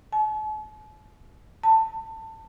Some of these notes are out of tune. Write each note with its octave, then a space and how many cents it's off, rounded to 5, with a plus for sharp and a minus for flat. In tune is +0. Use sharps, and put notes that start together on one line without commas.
A5 -45
A5 +20